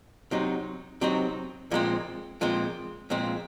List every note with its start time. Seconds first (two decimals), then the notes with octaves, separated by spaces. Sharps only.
0.31 C3 F#3 C4 D#4
1.01 C3 F#3 C4 D#4
1.71 A#2 F3 G#3 C4
2.41 A#2 F3 G#3 C4
3.10 A#2 F3 G#3 C4